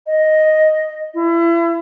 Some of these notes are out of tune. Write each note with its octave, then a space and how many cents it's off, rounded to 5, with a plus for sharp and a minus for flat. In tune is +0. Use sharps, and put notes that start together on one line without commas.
D#5 +0
E4 +35